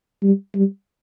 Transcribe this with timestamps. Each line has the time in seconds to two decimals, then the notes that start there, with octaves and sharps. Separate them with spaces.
0.23 G3
0.55 G3